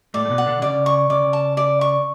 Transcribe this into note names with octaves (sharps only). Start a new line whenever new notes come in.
A2 A3 D5
A3
B2 B3
F#5
D3 D4
C#3 C#4 D5
C#6
C#3 C#4 D5
A5
D5
C#6